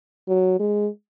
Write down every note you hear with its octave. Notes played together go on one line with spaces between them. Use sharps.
F#3
G#3